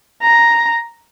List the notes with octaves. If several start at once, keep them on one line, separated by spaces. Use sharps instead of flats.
A#5